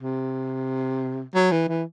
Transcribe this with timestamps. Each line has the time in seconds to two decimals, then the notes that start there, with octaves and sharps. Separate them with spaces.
0.02 C3
1.35 F#3
1.52 E3
1.68 E3